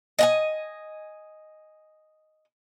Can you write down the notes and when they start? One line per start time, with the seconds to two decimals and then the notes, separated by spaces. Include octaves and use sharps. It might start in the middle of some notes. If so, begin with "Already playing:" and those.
0.19 D#5 F#5 G#5